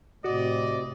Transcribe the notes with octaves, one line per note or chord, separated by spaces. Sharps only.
A2 C3 F#4 D5 D#5